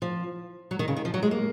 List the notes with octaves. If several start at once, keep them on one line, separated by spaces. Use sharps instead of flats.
F3
F#3
D#3
C#3
D#3
F3
F#3
G#3
A#3